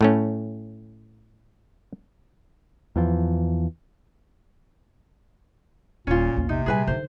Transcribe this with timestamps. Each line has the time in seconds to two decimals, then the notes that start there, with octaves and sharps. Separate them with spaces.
0.01 A2 A3 C#4
2.96 E2 E3 F3
6.07 D#1 A#2 C#4 F4
6.36 A#1 E2
6.49 C3 D#4
6.66 A#2 G3 G#4 B4 G#5
6.87 D3 D#3 C5